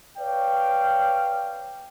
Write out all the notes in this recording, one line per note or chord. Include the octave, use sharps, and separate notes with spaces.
B4 C#5 D5 F5 G5